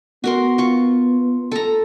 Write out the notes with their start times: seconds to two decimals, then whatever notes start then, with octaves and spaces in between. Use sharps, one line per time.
0.24 B3 F#4 A#4 C6
0.58 F4 C#6
1.52 A4 A#5